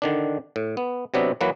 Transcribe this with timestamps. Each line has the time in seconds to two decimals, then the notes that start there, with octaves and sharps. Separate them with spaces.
0.02 D3 D#3 D4
0.56 A2
0.77 B3
1.14 C3 F#3 B3 D4 E5
1.41 E3 F#3 A#3 B4